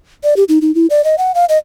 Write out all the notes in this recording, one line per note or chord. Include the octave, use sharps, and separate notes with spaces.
D5
G4
D#4
D#4
E4
D5
D#5
F#5
F5
D#5